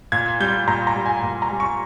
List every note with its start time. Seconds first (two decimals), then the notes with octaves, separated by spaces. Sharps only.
0.12 A#2 G#6
0.40 G3 G6
0.67 A#2 A#5
0.87 A#5
0.96 G3
1.06 G#5
1.23 A#2
1.42 A#5
1.51 G3
1.60 C#6